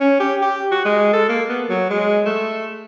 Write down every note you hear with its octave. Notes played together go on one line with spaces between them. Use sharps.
C#4
G4
G4
F#4
G#3
A4
A#3
B3
F#3
G#3
A3